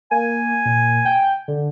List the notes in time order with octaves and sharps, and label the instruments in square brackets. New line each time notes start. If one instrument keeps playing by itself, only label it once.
[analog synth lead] A#3 [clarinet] G#5
[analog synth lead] A#2
G5
D3